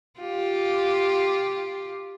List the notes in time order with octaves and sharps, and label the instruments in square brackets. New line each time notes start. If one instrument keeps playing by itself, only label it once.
[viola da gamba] F4 G4